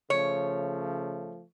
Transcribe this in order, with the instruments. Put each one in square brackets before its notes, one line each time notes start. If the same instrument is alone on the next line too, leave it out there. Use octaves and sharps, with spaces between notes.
[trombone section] C#3 F3 A3 [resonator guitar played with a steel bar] C#5